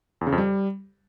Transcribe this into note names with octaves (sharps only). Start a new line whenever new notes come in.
E2
C#3
F2
G3